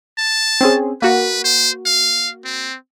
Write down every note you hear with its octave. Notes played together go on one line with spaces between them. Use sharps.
A5
C4 C#4 G#4
A#3 F#4 B4
C5
F5
C4